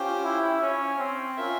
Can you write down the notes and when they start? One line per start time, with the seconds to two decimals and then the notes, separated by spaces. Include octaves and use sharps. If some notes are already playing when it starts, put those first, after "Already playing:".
Already playing: C#4 F4 G4 C5 G5
0.24 E4
0.62 C#4
0.98 C4
1.37 C#4 F4 A#4 E5